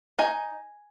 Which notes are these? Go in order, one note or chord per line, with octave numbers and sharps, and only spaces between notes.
D#4 G#5